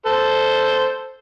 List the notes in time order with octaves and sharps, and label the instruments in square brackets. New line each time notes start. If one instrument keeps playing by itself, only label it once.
[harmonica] A4 C5